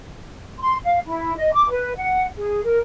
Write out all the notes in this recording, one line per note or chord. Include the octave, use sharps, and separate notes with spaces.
C6
F5
E4
D#5
D6
B4
F#5
G#4
A#4